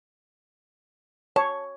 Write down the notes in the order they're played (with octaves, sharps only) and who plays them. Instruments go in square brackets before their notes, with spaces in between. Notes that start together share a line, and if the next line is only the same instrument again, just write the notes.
[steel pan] C#5 [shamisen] A5